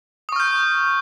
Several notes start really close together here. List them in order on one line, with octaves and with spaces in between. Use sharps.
D#6 C#6 F6 G6